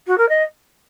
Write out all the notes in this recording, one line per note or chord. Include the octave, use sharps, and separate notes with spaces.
F#4
A#4
D#5